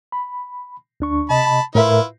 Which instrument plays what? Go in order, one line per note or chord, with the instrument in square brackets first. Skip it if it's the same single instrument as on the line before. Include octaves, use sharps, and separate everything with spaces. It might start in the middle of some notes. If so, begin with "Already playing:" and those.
[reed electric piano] B5
D2 D4 C#6
[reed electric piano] C3 D#5 [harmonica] A5 B5
[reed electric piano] A2 A#4 E5 [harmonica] E4 F4 B4